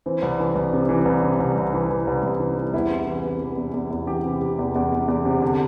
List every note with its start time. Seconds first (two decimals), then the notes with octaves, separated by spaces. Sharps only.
0.06 E3 C4
0.22 C2
0.39 E3
0.55 C2
0.73 C3
0.89 E3
1.05 C2
1.23 C3
1.40 C2
1.56 C2
1.73 E3
1.90 E3
2.07 C2
2.23 C2
2.40 E3
2.57 E3
2.73 E2 E4
2.91 C3
3.07 E3
3.24 C3
3.40 E3
3.57 E2
3.74 E2
3.91 E2
4.07 E3 G4
4.25 C3
4.42 C3
4.59 E2
4.75 E2
4.92 E2
5.08 E2
5.25 C3
5.42 D3